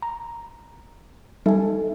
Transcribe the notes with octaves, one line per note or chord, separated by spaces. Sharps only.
A#5
G3 D#4 A4 E5 G#5